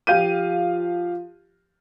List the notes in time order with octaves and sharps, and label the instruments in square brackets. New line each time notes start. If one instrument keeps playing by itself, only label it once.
[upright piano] F3 G4 F5 G6 D#7